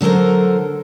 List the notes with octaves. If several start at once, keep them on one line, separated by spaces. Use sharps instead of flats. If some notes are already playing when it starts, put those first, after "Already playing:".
D3 F#3 A4 A#4 C5